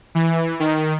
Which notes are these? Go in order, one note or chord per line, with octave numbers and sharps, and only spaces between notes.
E3
D#3